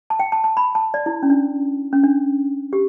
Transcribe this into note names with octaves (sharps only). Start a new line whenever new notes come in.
A5
G5
A5
A5
B5
A5
D5
E4
C#4
D4
C#4
D4
G4